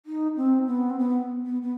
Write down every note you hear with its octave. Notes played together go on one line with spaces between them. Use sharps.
D#4
C4
B3
C4
B3
B3
B3